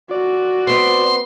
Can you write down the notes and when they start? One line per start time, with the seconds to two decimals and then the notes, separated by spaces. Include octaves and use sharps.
0.11 F#4 D5
0.67 B3 C4 C6